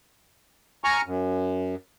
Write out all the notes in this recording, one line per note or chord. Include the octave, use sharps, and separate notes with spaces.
G#5 A#5 C#6 F6
F#2